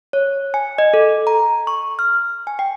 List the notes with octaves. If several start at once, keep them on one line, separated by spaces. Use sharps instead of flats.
C#5
G#5
D#5
A4
A#5
C#6
F6
G#5
G5